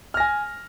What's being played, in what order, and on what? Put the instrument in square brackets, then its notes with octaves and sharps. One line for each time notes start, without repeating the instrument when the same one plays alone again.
[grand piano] F6
A#6
G#5